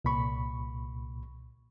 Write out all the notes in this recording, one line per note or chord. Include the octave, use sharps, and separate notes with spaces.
C2 A#2 B5 C#6